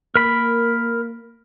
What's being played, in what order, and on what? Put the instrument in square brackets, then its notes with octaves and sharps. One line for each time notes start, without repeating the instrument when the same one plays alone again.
[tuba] A#3 [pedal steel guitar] A#4 B5